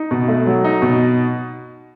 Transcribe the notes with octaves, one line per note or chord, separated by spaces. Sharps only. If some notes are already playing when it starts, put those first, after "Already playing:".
Already playing: D#4
B2
A3
F#3
D#4
B2